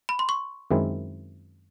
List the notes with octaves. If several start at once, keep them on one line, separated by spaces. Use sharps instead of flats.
B5
C6
C#6
F#2 D#3 G#3 C4 E4